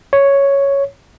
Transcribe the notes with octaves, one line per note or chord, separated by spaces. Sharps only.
C#5